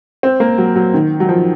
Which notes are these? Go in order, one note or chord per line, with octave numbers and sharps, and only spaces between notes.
C4
A#3
F#3
F#3
D#3
F#3
F3